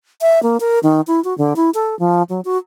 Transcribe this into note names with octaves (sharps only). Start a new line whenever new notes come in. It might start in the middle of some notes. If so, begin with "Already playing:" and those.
E5
A#3
A#4
D#3
E4
F#4
D3
E4
A4
F3
F#3
F#4